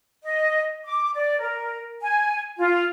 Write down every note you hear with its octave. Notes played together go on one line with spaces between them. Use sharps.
D#5
D6
D5
A#4
G#5
F4